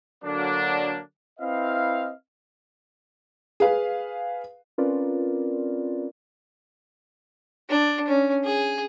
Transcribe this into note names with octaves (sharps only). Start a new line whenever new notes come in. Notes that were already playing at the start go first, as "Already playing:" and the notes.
D3 F#3 A#3 D4
C4 E4 B4 D#5 F5
G#4 B4 F5
C4 C#4 F4 A#4 B4 D5
D4
C#4
G#4